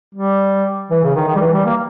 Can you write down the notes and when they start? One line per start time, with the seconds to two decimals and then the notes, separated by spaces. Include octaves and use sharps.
0.15 G3
0.91 E3
1.04 C#3
1.15 D#3
1.27 D#3
1.35 G3
1.41 E3
1.53 G3
1.66 A#3